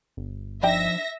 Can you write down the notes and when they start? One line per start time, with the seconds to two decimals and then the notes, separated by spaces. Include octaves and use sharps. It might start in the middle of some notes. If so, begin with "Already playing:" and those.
0.17 G1
0.63 F3 D4 D#4 E5 G5 A#6